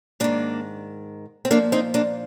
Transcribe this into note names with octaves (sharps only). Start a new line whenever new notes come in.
G#2 D#3 A#3 D4
C4
A#2 F3 A#3 D4
C4 D#4
A#3 D4